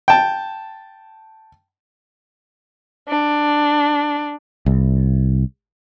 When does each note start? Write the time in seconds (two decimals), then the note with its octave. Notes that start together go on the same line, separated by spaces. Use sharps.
0.08 G5 A5
3.07 D4
4.66 C2